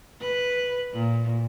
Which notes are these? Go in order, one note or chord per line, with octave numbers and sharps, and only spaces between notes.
B4
A#2